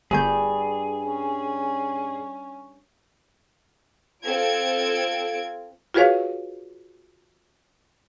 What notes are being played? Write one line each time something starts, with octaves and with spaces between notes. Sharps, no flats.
G1 G2 G#4 G6
C#4
C4 F4 A4 G#6 D7
F4 F#4 G#4 B4 C#5 F5